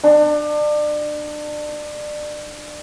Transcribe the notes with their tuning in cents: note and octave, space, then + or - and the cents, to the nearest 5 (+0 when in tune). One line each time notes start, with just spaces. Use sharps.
D4 +30